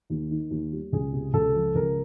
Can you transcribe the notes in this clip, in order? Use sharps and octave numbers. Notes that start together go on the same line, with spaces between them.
D#2
D#3
D#2
G3
C#2 G#4
C3
C#2 A4
F3
C#2 A#4